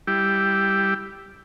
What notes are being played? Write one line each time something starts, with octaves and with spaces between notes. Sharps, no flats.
G3 E4 G4